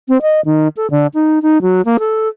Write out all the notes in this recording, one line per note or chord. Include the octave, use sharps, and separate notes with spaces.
C4
D#5
D#3
A4
D3
D#4
D#4
F#3
A#3
A4